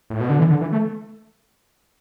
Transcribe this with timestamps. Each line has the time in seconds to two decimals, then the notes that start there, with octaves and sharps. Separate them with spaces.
0.10 A2
0.20 B2
0.29 D3
0.39 E3
0.50 D3
0.61 E3
0.72 A3